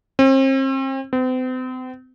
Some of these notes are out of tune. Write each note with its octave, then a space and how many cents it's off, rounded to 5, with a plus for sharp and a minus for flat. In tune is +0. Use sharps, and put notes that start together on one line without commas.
C4 +40
C4 -40